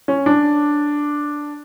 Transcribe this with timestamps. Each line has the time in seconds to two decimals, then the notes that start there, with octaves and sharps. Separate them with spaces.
0.08 C#4
0.26 D4